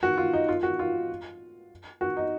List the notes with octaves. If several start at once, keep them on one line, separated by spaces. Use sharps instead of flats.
F#4
F4
D#4
F4
F#4
F4
F#4
D#4